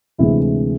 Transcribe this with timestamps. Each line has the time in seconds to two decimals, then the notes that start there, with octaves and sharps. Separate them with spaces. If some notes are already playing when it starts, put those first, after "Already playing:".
0.18 D2 C3 E3 G#3 E4